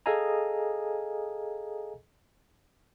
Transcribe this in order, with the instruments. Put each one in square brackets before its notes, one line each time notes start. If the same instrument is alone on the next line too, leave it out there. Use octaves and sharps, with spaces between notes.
[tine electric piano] G#4 A4 D#5 F5 G#5 A#5